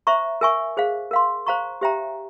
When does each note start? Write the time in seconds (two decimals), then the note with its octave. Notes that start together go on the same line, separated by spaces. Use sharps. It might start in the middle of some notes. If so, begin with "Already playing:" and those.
0.07 C5 E5 A#5 C#6
0.41 A#4 E5 G#5 C#6
0.77 G#4 C5 F5
1.11 A#4 F5 C6
1.47 C5 F5 A#5 C#6
1.81 G4 C5 E5 G5 A#5